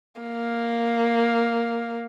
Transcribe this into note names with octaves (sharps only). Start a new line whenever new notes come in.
A#3